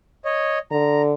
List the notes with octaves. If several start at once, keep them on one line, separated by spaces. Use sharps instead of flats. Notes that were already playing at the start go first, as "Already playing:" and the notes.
C#5 D#5
D3 A#5